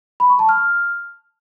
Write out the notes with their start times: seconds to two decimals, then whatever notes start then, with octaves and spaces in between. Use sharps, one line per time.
0.20 B5
0.30 C#6
0.39 A5
0.49 F6